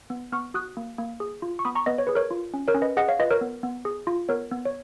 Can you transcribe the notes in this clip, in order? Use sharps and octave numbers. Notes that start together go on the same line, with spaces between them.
B3
B3 C#6 F6
F#4 D#6 F#6
A#3
A#3
G#4
F4
C#6
B3 B5 D#6
A#5 C#6
B3 B4 D#5
C#5
G#4 B4
A#4 C#5
F4
C#4
A#4 C#5
C#4
B4 D#5
G#4 D#5 F#5
C#5 F5
F4 B4 D#5
A#4 C#5
B3
B3
G#4
F4
B3 A#4 C#5
B3
C#5